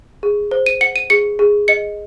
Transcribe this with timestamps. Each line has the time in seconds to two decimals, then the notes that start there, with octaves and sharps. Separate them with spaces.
0.23 G#4
0.51 C5
0.66 D#7
0.81 F#5 C#7
0.96 D#7
1.10 G#4 C#7
1.39 G#4
1.68 D#5 C#7